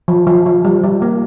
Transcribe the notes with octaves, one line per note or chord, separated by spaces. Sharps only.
F3
F3
F3
G3
G3
A#3